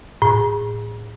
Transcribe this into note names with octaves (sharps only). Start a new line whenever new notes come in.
A2